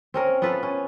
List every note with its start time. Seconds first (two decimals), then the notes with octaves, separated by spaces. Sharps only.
0.14 C4 C#4 A#4
0.42 B3 F4 A4 B4
0.63 C#4